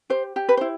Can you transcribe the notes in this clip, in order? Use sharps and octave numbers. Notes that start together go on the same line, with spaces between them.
G4 C5
G4
B4
E4 C5